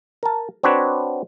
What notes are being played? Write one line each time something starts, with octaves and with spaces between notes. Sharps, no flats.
A#4 A5
C4 D4 F#4 B4 C#5